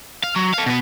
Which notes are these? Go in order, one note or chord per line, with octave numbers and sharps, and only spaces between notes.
F5
F#3
A4 F5
B2 B3